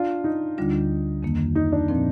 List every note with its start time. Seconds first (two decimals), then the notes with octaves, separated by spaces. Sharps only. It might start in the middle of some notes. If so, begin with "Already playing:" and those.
Already playing: D4 F4
0.24 D#4
0.58 D2 D3 G3 D4 F4
1.23 F2 D#3 A#3
1.55 D#4
1.72 D4
1.88 A#2 F3 C4